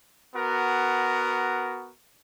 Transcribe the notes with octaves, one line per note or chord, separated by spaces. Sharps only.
B3 F#4 A#4